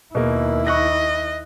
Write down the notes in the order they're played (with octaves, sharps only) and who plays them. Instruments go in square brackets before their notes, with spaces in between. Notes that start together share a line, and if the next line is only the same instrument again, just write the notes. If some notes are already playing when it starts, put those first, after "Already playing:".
[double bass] D#2 E4 [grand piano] B2 A#3
[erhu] D#5 [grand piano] C#6 F#6 A#6